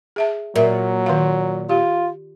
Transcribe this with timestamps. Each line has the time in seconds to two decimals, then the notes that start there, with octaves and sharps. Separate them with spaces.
0.16 G#4 E5 A5
0.56 A#2 F#3 A#4 E5
1.06 D#3 F5
1.69 F4 G4